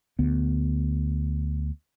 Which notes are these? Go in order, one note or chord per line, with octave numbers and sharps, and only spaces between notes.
D2 B3